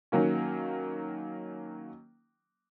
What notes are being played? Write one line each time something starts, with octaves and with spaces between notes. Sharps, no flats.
D#3 F#3 A#3 C#4